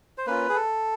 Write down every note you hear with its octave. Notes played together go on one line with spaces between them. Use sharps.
C5
A#3 C#4 F4 B4
G#4
A4